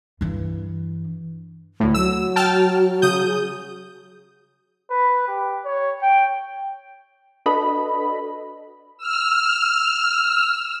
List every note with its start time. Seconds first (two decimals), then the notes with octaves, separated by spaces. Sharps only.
0.21 G2 E3
1.80 D2 A2
1.94 F#3 E6
2.36 G5 A5 F6
3.02 C#3 D#6 G6
3.26 G#4
4.90 B4
5.28 G4
5.65 C#5
6.02 G5
7.46 D4 F#4 A4 B4 D#5 B5
8.98 E6 F6